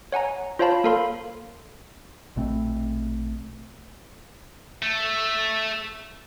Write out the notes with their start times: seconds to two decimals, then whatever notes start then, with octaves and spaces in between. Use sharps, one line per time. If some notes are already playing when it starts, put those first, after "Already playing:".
0.12 C#5 F#5 G#5 A#5
0.59 F4 C5 C#5 F5 A5 B5
0.84 A#3 A4 A#4 F5 B5 C6
2.36 A#1 B2 A3 C4
4.83 A3